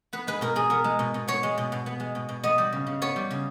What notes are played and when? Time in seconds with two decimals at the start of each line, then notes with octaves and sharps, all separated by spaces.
0.13 B3 B4
0.27 G#3 B4
0.41 B2 A#4
0.56 B2 G#4
0.70 B3 A#4
0.84 G#3
0.99 B2
1.14 B2
1.28 B3 C#5
1.43 G#3
1.58 B2
1.72 B2
1.86 B3
2.00 G#3
2.15 B2
2.29 B2
2.43 B3 D#5
2.58 G3
2.72 C#3
2.87 C#3
3.02 B3 C#5
3.16 G3
3.31 C#3